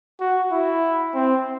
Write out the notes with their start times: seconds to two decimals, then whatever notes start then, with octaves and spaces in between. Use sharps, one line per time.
0.20 F#4
0.52 E4
1.15 C4